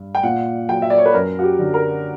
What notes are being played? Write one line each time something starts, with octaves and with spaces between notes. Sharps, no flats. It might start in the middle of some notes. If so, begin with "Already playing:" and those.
Already playing: G2
G5
A#2 F#5
F#3 G5
E5
D5
C#5
B4
F#2 A#4
F#4
G4
D3 F#3
A#4